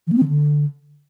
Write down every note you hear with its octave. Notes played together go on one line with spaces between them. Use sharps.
E3
A#3
C4
D#3
D3